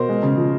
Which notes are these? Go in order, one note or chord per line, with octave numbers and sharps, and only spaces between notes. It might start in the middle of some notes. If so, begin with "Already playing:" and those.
Already playing: B2 A#4 C5
G#3
C#3
F3